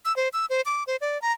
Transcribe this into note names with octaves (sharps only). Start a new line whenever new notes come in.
E6
C5
E6
C5
D6
C5
D5
A#5